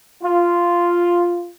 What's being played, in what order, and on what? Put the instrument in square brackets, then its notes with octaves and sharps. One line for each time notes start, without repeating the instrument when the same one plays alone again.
[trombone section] F4